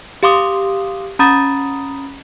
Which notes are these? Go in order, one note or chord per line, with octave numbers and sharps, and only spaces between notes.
G4 F5 C6 D6 D#6
C#4 A#5 B5 D#6 A6